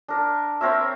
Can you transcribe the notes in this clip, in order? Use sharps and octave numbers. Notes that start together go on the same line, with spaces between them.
D4 A#4
C4 A#4 C#5 E5